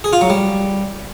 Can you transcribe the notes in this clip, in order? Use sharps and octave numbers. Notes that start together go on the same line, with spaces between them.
G#4
F4
F#3
G3